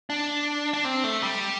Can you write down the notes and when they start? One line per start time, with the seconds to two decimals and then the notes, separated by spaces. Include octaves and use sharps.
0.10 D4
0.73 D4
0.85 C4
1.04 A3
1.23 G3